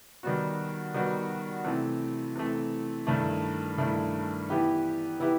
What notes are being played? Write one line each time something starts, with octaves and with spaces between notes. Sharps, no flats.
D#3 G3 B3 F#4
D#3 G3 B3 F#4
C3 E3 A3
C3 E3 A3
G2 D#3 A3 E4
G2 D#3 A3 E4
E3 B3 E4 G4 B4
E3 B3 E4 G4 B4